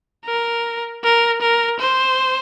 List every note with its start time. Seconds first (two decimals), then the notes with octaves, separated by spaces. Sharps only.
0.25 A#4
1.04 A#4
1.42 A#4
1.81 C5